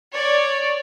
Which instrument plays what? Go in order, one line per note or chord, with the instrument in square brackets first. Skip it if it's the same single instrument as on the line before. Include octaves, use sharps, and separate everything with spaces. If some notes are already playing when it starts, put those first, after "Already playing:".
[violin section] C#5 D5